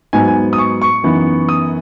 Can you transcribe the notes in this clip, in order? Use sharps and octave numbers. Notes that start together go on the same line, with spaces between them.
G#2 F#3 B3 D#4 G#5
G#5
D#6
C#6
C#6
F#2 E3 B3 D#4
D#6